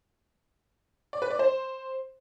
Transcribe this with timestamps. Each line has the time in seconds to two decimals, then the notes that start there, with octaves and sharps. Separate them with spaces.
1.13 D5
1.22 B4
1.31 D5
1.39 C5